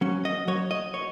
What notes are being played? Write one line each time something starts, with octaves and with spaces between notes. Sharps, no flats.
F#3 C#4
D#5
F#3 C#5
D#5
C#5